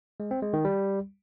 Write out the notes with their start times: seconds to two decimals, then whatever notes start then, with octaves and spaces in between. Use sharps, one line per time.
0.20 G#3
0.31 C4
0.42 G#3
0.53 D#3
0.65 G3